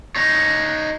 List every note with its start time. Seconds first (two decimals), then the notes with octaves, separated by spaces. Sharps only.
0.16 D#4 C#5